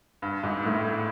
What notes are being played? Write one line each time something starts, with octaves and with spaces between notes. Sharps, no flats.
G2
G#2
A2